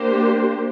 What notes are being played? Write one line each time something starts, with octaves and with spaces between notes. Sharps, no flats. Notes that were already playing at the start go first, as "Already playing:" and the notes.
Already playing: A#3 D4 G4 C5